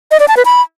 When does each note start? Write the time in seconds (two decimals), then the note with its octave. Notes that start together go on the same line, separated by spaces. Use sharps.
0.11 D#5
0.20 D5
0.28 A5
0.37 B4
0.45 B5